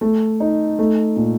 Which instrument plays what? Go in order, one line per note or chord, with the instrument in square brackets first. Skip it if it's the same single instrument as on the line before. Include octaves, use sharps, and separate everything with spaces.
[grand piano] A3
D#4
A3
A#2